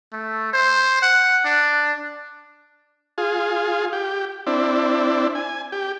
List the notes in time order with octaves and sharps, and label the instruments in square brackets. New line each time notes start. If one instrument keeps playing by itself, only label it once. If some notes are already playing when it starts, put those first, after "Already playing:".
[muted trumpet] A3
C5
F#5
D4
[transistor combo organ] F4 G#4
G4
C4 D4 E4
G#5
G4